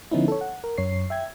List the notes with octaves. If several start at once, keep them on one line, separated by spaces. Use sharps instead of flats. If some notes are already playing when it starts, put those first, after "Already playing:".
D3 F3 B3 C#4 D#4 E4
A4 C#5
F#5
A#4
F#2 C#5 C7
E5 G5 G#6